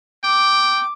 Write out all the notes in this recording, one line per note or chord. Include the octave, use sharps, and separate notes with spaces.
G5 D6